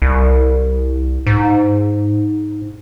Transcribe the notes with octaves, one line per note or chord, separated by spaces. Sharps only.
C2
G#2